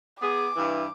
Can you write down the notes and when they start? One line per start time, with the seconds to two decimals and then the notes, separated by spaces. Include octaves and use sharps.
0.21 B3 G#4 D6
0.56 G2 E3